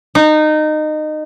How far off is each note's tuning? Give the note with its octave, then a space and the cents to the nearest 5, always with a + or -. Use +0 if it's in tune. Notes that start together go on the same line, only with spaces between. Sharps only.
D#4 -20